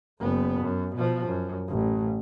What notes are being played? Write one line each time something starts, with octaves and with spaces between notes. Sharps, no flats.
F#1 B3
F#2
B2 F3
F#2
A1